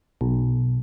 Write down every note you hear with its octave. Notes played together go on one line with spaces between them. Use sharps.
B1